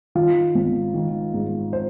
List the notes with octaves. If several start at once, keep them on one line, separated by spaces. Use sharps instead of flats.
D#3 F4
G#1
D#3
G#2
C5